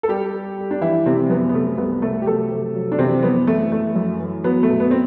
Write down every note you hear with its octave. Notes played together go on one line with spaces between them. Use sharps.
A4
G3 G4
G3
G3
D4
E3 E4
C3 G3 C4
F#2 B3
B3
C3 A3
C2 B3
C3 A3 A4
G4
F#3 A3 A4
C3
F#3
D4
C3 E3 C4
F#2 B3
E3 A3
A3
F#2
E3
F#3 B3
A3
B2
B3
C4